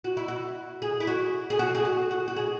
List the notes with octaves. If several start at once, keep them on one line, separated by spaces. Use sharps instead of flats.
F#4
E4
F#4
G#4
E4
F#4
G#4
F#4
G#4
F#4
F#4
F#4
G#4